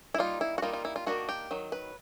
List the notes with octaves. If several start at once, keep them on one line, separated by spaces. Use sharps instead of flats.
E4
G3 A#3 D#4 F4
E4
F#4
G3 A#3 D#4 F4
F4
E4
F4
D#3 F#3 A#3 D4 F#4
G4
D#3 F#3
B4